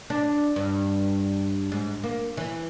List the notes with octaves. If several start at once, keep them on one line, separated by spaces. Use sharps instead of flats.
D4
G2
G#2
A#3
E3